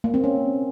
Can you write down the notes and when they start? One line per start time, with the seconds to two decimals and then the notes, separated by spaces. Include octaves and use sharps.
0.04 A#3
0.14 C4
0.24 C#4